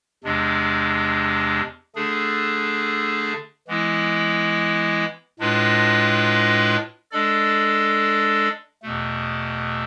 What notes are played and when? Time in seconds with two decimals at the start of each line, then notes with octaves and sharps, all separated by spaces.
0.24 E2 C3 G#3 D4
1.96 D3 A3 D4 G#4
3.68 E3 G#3 B3 E4
5.39 A2 G#3 D4 F4 B4
7.11 G#3 D4 A4 D5
8.83 E2 B2 A3